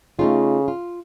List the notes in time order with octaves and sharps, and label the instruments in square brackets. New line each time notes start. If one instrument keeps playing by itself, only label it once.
[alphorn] C#3 [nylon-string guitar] A3 D#4 F4
[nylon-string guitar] F4